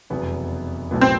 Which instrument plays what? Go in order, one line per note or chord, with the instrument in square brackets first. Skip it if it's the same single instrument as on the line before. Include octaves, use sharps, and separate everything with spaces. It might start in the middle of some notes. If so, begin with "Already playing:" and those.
[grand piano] F1 E2 B2 F#3 B3
B1 A2 F#3 B3
[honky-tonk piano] C4